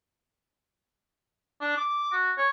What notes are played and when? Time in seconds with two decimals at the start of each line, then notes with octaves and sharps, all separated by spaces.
1.61 D4
1.77 D6
2.12 F#4
2.38 C#5